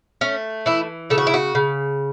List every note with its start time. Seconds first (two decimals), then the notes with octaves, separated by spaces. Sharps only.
0.21 A3 C#4
0.66 E3 E4
1.10 C#3 A4
1.18 F#4
1.27 E4
1.34 F#4
1.55 C#3